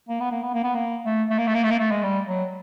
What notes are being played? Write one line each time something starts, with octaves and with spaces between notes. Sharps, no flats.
A#3
B3
A#3
B3
A#3
B3
A#3
A3
A3
A#3
A3
A#3
A3
A#3
A3
G#3
G3
F#3